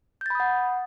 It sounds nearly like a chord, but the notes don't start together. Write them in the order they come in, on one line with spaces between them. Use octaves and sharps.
G6 A6 B5 D#6 F#5